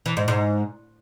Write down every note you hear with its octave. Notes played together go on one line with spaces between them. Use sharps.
E3
G#2
G#2